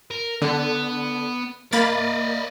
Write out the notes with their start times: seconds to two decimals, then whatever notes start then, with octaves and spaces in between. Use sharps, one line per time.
0.11 A#4
0.42 D3 B3
1.73 A#3 D5 D#5 B5 A6